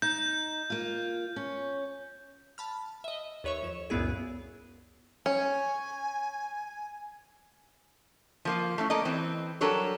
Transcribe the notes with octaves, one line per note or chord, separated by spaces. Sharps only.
D#4 G6
A#3 F4
C#4
A5 B5 F6
D#5 E5
D#2 B4 C#5 E5 C#6
F2 E7
C#2 F#2 A#2 B3 E4 G#4
C#4 G#5
F3 A#3 F4
A3 C#4 E4
A#3 A4 D5 D#5
E3 C4
F#3 G3 D4 A4 A#4 C#5